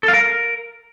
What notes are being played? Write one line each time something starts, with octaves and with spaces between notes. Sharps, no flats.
A4
F5
A#4